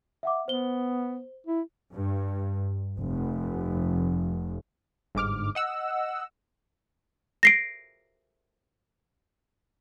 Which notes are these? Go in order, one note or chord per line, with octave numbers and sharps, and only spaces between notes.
E5 F#5 D6
B3 C5 G7
E4
G2
F1
G1 G#2 D6 F6
D#5 F#5 E6
A#6 C7 D7